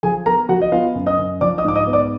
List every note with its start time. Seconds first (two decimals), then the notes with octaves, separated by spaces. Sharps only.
0.03 F3 G#4 G#5
0.26 B3 A#4 A#5
0.49 F3 F#4 F#5
0.62 D#5
0.72 B3 F4 F5
0.95 F#2
1.06 D#5 D#6
1.18 F#2
1.41 F3 D5 D6
1.58 D#5 D#6
1.65 G#2 D6
1.76 D#5 D#6
1.87 B3
1.93 D5 D6